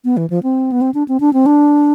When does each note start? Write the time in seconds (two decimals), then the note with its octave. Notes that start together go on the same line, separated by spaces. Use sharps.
0.05 B3
0.17 E3
0.30 F3
0.43 C4
0.72 B3
0.81 C4
0.94 D4
1.08 C4
1.20 D4
1.33 C4
1.46 D4